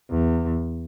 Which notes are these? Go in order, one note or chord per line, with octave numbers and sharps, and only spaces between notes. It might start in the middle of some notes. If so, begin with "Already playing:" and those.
E2